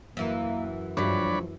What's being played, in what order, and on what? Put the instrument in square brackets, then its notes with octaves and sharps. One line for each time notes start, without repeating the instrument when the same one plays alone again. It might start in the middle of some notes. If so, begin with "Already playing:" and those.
[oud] F#2 E3 [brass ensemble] A#3
[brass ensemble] D2 F3 [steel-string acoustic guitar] G2 F#3 [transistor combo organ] C#5 D5 B5